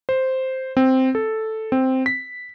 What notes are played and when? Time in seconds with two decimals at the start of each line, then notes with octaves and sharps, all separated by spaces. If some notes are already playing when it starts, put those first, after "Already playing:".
0.09 C5
0.77 C4
1.15 A4
1.72 C4
2.06 B6